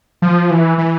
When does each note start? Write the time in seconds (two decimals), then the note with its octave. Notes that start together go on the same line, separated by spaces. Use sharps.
0.22 F3
0.51 E3
0.78 E3